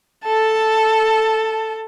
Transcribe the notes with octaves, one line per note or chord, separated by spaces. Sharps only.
A4 A5